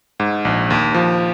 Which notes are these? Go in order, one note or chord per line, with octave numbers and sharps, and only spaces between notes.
G#2
A#1
D#2
F3